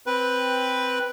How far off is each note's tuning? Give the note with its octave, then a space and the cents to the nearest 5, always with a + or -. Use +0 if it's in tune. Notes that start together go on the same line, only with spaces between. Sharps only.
C4 +0 B4 +0 G5 +5